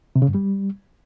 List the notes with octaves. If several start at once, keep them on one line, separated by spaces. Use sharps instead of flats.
C3
C#3
G2
G3